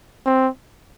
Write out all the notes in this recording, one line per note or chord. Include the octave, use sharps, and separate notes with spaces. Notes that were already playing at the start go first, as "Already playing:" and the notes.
C4